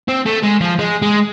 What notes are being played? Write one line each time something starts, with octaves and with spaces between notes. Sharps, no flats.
C4
A3
G#3
F3
G#3
G#3